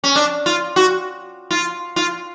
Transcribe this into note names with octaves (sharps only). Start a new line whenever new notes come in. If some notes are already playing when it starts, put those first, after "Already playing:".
C#4
D4
F4
F#4
F4
F4